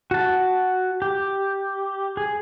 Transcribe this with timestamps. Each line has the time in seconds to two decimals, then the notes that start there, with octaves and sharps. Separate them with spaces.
0.11 F#4 A5
1.02 G4
2.17 G#4